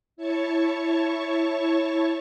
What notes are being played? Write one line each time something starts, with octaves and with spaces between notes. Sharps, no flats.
E4 C#5 A5 C#6